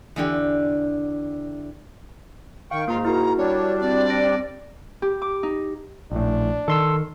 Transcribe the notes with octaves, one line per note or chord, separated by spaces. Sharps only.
E2 D3 G4
D#3 F5 G5 C#6
G#2 A#3 F4 A#5
E4 F#4 A#4 A#5
G3 D4 C#5
C4 D5
A#6 D7
G4
D6
D#4
A#1 A2 D4
D#3 A4 C6 E6